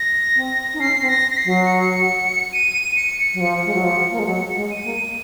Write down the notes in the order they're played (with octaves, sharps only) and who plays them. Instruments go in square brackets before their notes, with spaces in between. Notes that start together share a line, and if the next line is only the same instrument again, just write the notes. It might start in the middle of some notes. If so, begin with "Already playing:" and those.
Already playing: [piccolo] A#6
[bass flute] C4
D#4
[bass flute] C#4 [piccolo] C7
[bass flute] C4
[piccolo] A#6
A#6
C7
[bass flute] F#3
[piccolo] C#7
D#7
C#7
[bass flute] F#3
[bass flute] F3 [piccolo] C#7
[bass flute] G#3
F#3
F3
A#3
G#3
[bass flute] F#3 [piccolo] C#7
[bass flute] G#3
[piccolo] D#7
[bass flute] A#3